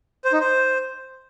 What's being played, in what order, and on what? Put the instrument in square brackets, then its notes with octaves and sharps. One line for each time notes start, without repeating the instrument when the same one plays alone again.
[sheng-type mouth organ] C5
D#4
C5